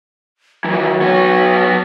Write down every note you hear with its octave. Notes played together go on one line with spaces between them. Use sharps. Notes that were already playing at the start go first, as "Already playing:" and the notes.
D#3 E3 F#3
B3 C#5